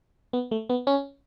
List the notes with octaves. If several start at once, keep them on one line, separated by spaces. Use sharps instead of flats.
B3
A3
B3
C#4